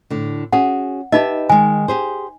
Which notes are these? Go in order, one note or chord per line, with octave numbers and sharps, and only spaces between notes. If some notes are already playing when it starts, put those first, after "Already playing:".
A2 D3
C#4 F#4 G#4 F#5
D#4 G4 B4 D#5 E5
D#3 G#3 G#5
G4 G#4 C5